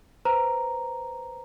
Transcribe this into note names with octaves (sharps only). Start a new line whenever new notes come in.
B4 C5 A#5